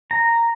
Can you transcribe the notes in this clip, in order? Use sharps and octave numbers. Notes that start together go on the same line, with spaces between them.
A#5